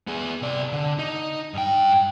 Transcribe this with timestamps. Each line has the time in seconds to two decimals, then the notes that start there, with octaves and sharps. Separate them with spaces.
0.07 B3 G#4
0.42 C3 D5
0.72 D3
0.99 D#4
1.54 G2 G5